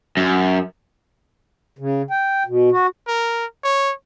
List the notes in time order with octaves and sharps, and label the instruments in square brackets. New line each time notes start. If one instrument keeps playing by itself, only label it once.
[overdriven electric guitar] F#2
[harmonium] C#3
G5
B2
F#4
[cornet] A#4
C#5